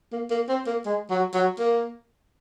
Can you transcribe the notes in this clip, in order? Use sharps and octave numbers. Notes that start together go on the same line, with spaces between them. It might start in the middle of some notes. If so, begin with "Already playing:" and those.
A#3
A#3
C4
A#3
G#3
F#3
F#3
A#3